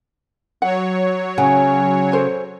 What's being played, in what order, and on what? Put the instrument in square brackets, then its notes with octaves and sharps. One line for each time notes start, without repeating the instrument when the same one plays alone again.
[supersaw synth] F#3 C#5 [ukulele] F#5
[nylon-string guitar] C#3 [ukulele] F#5
[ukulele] A4 C5 G#5